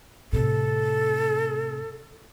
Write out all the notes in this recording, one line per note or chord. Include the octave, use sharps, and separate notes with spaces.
A2 C3 A4